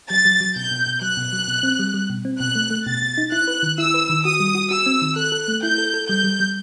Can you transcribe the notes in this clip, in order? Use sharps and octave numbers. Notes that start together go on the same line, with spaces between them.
F#3 A6
F#3
F#3
B2 G6
B2
B2
F#3 F#6
B2
F#3
B2
C4
G3
G3
B2
C4
B2 F#6
A3
A3
B2 A6
B2
D#4
E4 F#6
B4
D#3
E4 E6
B4
D#3
F#4 D#6
G3
F#4
F#4 E6
C4
D#3
A4 F#6
A4
A3
E4 G6
A4
A4
G3 G6
G3
G3